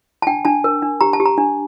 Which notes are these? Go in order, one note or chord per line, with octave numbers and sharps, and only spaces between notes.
A5
D4 G5
D4 A5
A#4
D4
G4 A#5
A5
G4
A#5
D4